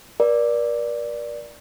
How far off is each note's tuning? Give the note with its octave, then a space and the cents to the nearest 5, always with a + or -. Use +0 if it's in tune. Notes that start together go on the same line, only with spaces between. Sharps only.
A#4 +40 D5 +0